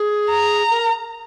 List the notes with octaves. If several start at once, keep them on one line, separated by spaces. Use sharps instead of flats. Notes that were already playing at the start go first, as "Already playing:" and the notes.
Already playing: G#4
A#5
A#4